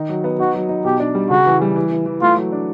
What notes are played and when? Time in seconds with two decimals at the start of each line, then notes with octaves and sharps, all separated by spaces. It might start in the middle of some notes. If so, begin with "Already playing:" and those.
Already playing: D#3 D#4
0.09 F#3
0.24 B3
0.39 D#4 F#4
0.54 F#3
0.69 D#4
0.85 B2 G4
1.00 D4
1.15 G3
1.30 C#3 F#4
1.46 E3
1.61 G3
1.76 E3
1.92 E3
2.06 E3
2.22 A3 F4
2.37 F#3
2.52 D4